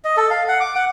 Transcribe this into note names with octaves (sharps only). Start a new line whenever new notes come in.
D#5
A4
F5
F#5
D6
F#5